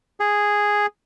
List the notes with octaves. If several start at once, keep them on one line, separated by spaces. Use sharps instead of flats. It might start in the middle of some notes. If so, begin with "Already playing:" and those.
G#4